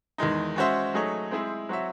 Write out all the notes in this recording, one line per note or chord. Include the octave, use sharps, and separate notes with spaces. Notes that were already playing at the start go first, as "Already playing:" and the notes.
E2 D#3 G#3 D#4
G#3 C#4 F#4 C5 E5
F#3 A3 D#4 G#4 C#5
G#3 C4 E4 G#4 C5
F#3 C4 F#4 C#5 E5